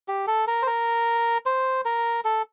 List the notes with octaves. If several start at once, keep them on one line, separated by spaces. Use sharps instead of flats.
G4
A4
A#4
C5
A#4
C5
A#4
A4